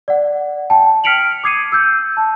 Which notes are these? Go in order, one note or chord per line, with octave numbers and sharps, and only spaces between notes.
D5 F#5
G5 A5
F6 B6 C#7 D7 F7 F#7
D6 D#6 G#6 C7 C#7 D#7
E6 G6
A5